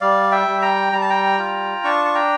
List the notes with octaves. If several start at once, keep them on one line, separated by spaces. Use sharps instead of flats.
G3 D5 F5
E5 G5
G3
G5 A#5
G3 A#5
A5
G5 A#5
F4
D4 A5 C#6
C#6
G5 A#5